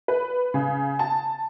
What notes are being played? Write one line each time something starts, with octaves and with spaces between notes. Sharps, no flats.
B4
C#3
A5